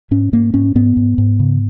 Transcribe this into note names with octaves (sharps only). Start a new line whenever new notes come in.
G#2 C#4
G#2 A#3
G#2 C#4
G#2 B3
G#2
G#2
C#3